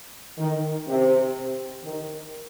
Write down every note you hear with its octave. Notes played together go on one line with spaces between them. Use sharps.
D#3
C3
D#3